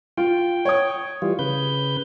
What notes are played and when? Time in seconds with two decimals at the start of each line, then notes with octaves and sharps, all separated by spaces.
0.17 F4 G5
0.65 C#5 D#6
1.22 E3 G3 F4
1.39 C#3 B4 G6